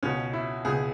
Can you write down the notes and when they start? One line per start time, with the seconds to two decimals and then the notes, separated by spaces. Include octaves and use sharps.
0.03 C#2 B2 C#4
0.33 E4
0.65 C#2 B2 G#4